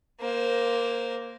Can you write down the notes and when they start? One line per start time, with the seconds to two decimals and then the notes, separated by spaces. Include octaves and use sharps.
0.20 A#3 C5